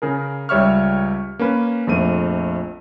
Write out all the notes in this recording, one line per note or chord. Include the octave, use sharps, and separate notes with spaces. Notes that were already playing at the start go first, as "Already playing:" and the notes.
C#3 G#4 A#4
C#2 G3 C#5 E5 C#6 F6
A#3 C#4 B4
A#1 F2 A3 D#7